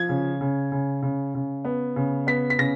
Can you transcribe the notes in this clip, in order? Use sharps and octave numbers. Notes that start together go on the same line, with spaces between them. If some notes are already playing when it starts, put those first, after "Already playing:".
Already playing: F3 G#6
C#3
C#3
C#3
C#3
C#3
B3
C#3
B3 B6
B6
C#3 A#6